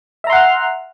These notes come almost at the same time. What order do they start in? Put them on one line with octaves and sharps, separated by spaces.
E5 A#5 C6 F#5 F6